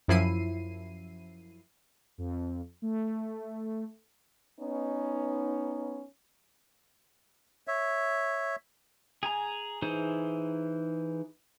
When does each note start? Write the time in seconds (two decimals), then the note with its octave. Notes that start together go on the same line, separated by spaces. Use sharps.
0.08 F#2 F3 E4 C7 D#7
2.18 F2
2.82 A3
4.60 B3 C#4 D#4
7.68 C#5 E5
9.23 G#4 G#5 A#5
9.82 E3 D#4 G#4 C5